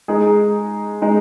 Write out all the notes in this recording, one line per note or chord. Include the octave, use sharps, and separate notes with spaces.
G#3 D#4 G#4
G#3 D#4 G#4